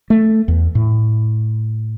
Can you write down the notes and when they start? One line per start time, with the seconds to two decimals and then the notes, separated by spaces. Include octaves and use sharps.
0.10 A3
0.48 E2
0.75 A2